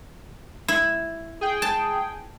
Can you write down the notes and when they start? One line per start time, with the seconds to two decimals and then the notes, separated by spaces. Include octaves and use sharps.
0.68 E4
1.41 G#4 G5
1.62 A5